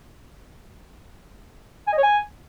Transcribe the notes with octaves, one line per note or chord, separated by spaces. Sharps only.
G#5
D#5
C#5
G#5